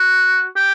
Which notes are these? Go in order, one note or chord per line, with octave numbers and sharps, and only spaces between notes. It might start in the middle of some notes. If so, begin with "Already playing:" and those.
Already playing: F#4
G4